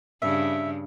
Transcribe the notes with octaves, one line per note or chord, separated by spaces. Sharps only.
G2 C#3 E5